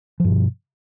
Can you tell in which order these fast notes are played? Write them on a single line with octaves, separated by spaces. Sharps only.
F3 G2 B2